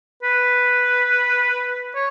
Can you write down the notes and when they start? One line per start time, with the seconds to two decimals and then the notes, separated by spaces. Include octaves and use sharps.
0.23 B4
1.95 C#5